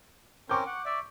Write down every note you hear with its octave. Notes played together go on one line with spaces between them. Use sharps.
C4 C#4 A#4 C#6 D6 G6
F#5
D5 E5